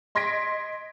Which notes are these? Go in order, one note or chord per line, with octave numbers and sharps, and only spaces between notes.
D#5 C6 G#6 A#6 B6 D7